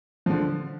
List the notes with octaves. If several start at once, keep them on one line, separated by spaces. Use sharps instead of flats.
D3 F3